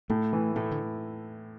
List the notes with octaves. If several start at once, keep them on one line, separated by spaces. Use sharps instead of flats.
A2 A3
E3
A2 A3
D3